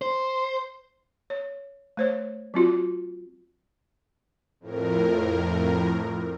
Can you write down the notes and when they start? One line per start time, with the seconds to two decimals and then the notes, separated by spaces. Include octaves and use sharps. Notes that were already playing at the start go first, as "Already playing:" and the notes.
0.02 C5
1.30 C#5
1.97 A3 C5 C#5
2.54 F#3 C4 F4 F#4
4.60 F2 A2 A#4